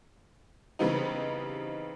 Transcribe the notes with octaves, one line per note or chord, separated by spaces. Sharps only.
C#3 E3 G3 B3 C4 D#4